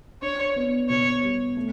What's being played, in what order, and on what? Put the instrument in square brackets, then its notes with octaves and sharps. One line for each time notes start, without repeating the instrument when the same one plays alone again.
[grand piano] D4 [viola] C#5
[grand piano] B3
[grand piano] B2 [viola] C#5
[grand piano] G3
A3